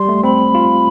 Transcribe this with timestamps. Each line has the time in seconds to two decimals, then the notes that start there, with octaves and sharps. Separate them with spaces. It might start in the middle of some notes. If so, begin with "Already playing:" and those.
Already playing: G3 C6
0.09 A3
0.23 C4 B5
0.55 F4